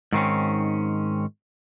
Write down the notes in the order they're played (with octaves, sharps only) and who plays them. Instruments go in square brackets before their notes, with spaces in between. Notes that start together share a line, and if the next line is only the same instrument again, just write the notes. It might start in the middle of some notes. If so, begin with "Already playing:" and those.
[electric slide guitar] G#2 D#3 C4 C#4